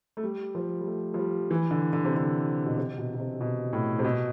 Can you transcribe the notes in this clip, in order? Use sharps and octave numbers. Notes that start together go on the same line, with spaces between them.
A3
G3
F3
G3
A3
F3
G3
E3
D3
D3
C3
D3
B2
C3
B2
B2
C3
B2
A2
C3
B2